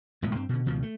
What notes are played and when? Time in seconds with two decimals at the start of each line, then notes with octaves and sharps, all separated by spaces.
0.22 E1 A2 G#3 B3
0.35 G2 C4
0.49 B2 D3
0.66 C#2 B2 D#3 F3
0.83 A3